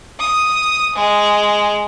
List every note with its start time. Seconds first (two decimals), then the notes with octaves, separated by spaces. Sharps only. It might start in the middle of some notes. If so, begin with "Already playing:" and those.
0.19 D#6
0.96 G#3